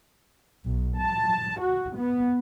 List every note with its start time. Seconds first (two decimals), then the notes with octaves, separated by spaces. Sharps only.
0.65 B1
0.97 A5
1.62 F#4
1.98 B3